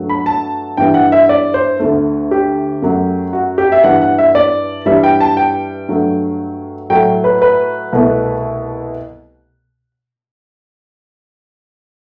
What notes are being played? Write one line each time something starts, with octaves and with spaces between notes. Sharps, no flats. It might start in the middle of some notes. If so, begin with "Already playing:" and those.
Already playing: G2 F#3 A3
B5
A5
G2 E3 G3 G5
F#5
E5
D5
C5
D2 D3 A3
G4
F#2 F#3 A3
F#4
G4
E5
G2 E3 G3 F#5
F#5
E5
D5
G2 E3 G3 E5
G5
A5
G5
G2 F#3 A3
A2 F#3 A3 G5
B4
B4
C2 B2 A3